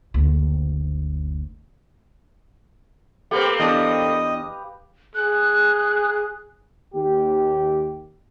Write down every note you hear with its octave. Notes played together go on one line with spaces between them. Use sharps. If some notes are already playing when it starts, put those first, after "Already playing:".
F#1 D2
A3 A#3 C4 G4 B4 F5
E2 D4 D#5
G#4 F#6
D#2 G4